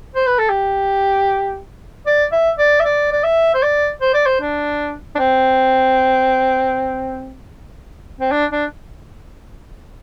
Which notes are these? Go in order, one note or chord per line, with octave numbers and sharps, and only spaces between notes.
C5
B4
A4
G4
D5
E5
D5
E5
D5
D5
E5
C5
D5
C5
D5
C5
D4
D4
C4
C4
D4
D4